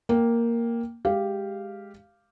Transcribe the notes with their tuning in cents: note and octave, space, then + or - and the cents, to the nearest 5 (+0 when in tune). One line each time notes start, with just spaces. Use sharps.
A#3 +0 G5 +0
G#3 +0 G4 +0 F5 -10